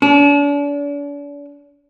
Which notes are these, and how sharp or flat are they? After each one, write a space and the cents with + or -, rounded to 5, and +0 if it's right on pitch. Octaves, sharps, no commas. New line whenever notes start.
D4 -40